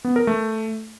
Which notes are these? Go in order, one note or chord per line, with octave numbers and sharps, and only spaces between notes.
B3
A#4
A3